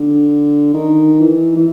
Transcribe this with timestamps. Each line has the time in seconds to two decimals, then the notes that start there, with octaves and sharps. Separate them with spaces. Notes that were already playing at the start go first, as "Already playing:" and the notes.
Already playing: D3
0.74 D#3
1.20 E3
1.56 E3